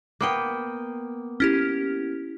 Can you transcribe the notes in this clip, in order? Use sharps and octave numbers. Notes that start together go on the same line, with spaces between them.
A#3 B3 G5
C#4 E4 G4